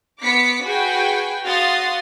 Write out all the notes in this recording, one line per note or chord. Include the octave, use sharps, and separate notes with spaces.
B3 D6 B6 C#7
F#4 G#4 B4 G5 G#5
F#4 F5 C6 D#6 A6